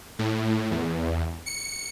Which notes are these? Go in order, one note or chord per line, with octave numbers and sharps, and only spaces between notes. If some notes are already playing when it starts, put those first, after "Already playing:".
A2
E2
C#7